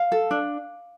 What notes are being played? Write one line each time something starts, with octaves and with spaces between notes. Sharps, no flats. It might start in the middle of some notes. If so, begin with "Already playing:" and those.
Already playing: F5
A4
D4